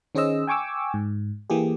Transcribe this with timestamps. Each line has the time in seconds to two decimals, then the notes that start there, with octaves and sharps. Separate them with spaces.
0.15 D#3 C#4 G#4 C5 D#5 E6
0.47 G5 G#5 C#6 D6 E6
0.94 G#2
1.50 E3 A#3 G4 G#4